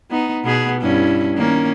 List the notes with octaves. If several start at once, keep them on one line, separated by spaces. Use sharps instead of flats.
B3 D#4
B2 B3 G#4
G2 C#4 E4
D#3 A#3 C#4